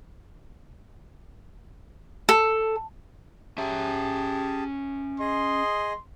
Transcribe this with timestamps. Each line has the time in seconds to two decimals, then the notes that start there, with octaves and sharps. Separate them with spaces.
2.29 A4
3.58 C#4 G4 G#4 E5 A5
5.20 G#4 D#5 C6